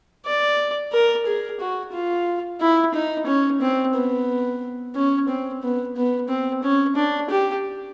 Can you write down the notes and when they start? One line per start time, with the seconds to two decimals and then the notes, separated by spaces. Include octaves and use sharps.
0.26 D5
0.92 A#4
1.26 G#4
1.60 F#4
1.92 F4
2.61 E4
2.94 D#4
3.27 C#4
3.61 C4
3.94 B3
4.95 C#4
5.28 C4
5.62 B3
5.96 B3
6.29 C4
6.63 C#4
6.96 D4
7.30 G4